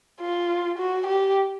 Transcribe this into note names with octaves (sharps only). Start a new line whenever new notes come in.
F4
F#4
G4